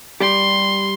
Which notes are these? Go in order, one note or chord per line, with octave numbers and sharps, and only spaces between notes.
G3 G4 C6